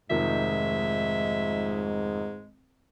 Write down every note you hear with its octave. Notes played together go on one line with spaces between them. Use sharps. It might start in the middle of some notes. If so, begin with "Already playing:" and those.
F1 G#2 D#3 F3 G#3 E5